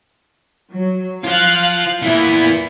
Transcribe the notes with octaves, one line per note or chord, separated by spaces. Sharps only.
F#3
F4 C5 F5 F#6
A#2 E3 B3 E4